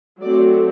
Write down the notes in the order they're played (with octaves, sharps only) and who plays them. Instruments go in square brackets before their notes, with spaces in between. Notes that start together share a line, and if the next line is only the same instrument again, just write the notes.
[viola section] F#3 A3 C4 D5